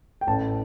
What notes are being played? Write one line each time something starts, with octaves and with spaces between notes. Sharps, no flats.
G5
A1 A5